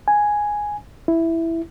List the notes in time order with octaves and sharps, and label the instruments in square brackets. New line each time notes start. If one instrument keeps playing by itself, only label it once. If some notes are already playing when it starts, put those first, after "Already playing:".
[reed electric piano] G#5
E4